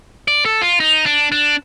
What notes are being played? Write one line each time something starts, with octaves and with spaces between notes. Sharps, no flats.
D5
A4
F4
D#4
D4
D4